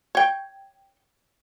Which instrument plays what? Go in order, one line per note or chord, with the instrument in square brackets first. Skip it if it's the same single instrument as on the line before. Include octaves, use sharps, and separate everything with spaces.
[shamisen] C#5 G5